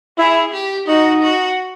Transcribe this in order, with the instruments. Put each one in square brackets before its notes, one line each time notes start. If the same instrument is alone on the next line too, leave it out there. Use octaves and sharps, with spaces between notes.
[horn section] E4 [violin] G#4
[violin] G4
[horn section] D#4 [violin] F#4
[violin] F#4